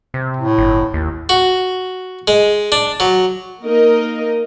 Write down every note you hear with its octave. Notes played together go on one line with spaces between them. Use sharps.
C3
A2
G1
D#2
F#4
G#3
D4
F#3
A#3 D#4 A#4 D#5